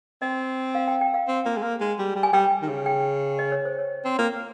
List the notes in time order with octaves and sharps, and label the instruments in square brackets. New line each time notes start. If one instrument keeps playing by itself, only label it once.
[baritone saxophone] C4 [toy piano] D#5
[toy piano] F5
G5
G5
F5
[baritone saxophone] C4
A#3
G#3
A#3
G#3
G3
G3
[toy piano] G#5
[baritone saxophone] G3 [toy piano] G5
[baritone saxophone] D#3
C#3
[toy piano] G5
D#5
C#5
C5
C#5
[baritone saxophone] C4
A#3